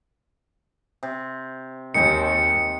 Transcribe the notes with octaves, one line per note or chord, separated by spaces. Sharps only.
C3
D#2 D#3 G#3 G5 C#7